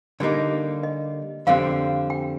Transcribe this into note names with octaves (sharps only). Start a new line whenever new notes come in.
D3 G3 A#3 D#4 D5
D#5
F2 D3 G3 C4 F5
G5